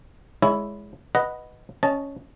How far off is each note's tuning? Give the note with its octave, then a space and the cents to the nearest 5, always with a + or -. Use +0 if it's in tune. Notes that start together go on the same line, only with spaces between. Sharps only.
G#3 +0 E4 +0 C#5 +25
B4 +0 D#5 +0 F#5 +0
C#4 +0 D#5 +0 A5 -15